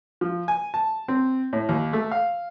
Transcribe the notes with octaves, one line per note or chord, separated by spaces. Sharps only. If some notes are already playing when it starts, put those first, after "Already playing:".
F3
G#5
A5
C4
A2
D#2
A3
F5